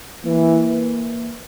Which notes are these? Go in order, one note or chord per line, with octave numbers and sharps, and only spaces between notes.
E3 A#3